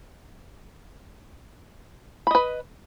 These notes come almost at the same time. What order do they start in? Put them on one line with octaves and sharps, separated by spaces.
B5 D#5 B4